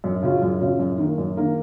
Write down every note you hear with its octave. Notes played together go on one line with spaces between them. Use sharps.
F#2
C#3 F#3 C#4 F4
F#2
C#3 F#3 C#4 F4
F#2
D#3 A#3
F#2
D#3 A#3